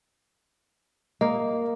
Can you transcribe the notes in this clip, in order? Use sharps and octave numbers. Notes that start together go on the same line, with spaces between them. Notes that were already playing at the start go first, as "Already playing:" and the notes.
A#3 D#5